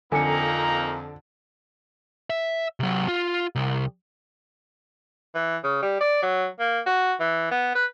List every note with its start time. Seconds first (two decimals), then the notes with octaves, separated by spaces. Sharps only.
0.12 F2 D3 A#3 D#4 G#5 A#5 C#7
2.30 E5
2.80 C3 F#3
3.08 F4
3.55 C2
5.35 E3
5.64 C#3
5.82 G3
6.01 D5
6.23 F#3
6.60 A#3
6.86 F#4
7.20 E3
7.51 B3
7.75 B4